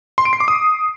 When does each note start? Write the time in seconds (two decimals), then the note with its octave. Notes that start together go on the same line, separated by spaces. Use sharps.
0.18 C6
0.25 D7
0.33 C7
0.40 D6
0.48 D#6